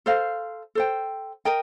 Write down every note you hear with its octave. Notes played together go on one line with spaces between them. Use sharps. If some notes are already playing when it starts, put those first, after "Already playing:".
A4 C5 F5
A4 C5 G5
A#4 D#5 G5